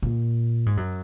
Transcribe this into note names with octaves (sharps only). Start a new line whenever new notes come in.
A#2
G#2
F#2